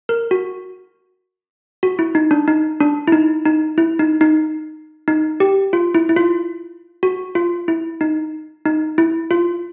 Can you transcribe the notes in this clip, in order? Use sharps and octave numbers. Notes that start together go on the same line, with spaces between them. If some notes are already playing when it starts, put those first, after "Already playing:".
A#4
F#4
F#4
E4
D#4
D4
D#4
D4
E4
D#4
D#4
E4
D#4
D#4
D#4
G4
F4
E4
E4
F4
F#4
F4
E4
D#4
D#4
E4
F4